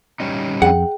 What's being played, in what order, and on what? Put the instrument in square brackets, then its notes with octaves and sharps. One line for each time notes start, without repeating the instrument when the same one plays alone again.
[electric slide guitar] G3 C#4 D#4
[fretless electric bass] F2 [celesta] G#4 G5 [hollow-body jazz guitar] F#5